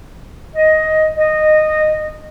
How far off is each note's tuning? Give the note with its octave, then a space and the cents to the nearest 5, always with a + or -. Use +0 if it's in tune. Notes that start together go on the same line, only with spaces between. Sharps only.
D#5 +10
D#5 -15